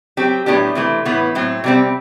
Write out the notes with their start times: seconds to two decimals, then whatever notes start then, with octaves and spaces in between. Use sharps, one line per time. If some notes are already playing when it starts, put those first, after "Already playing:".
0.17 F#3 C4 G4
0.46 A2 F#3 B3 D4 G4
0.75 C3 E3 A3
1.05 A2 E3 B3
1.35 A2 F#3 C4
1.64 C3 G3 C4